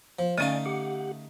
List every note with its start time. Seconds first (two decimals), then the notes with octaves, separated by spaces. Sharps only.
0.19 F3
0.38 D3 A3 C#4 D#4 D5 F5 G#5
0.66 G4 F#5